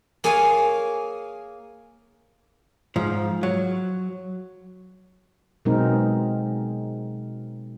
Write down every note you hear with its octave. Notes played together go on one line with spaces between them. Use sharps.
A#3 G#4 C#5 F5 G#5
G#2 F3
F#3
B2 F#3 G#3 C4 D#4 A#4